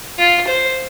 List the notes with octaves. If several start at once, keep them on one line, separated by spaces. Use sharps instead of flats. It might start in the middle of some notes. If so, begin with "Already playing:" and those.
F4
C5